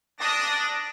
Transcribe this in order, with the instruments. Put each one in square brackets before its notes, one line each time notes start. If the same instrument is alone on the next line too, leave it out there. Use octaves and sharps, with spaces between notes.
[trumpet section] D4 [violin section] D#6 A#6